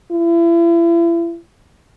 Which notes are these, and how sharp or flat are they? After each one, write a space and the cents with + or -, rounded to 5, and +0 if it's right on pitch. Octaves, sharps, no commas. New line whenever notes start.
E4 +40